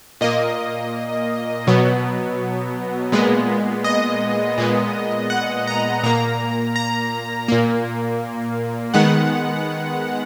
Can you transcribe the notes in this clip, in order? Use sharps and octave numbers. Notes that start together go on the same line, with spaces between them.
A#2 A#3 D#5
B2 F#3 B3
A#2 G#3 B3
D#5
A#2 G#3 B3
F#5
A#5
A#2 A#3 A#5
A#5
A#2 A#3
D#3 G#3 B3 F#5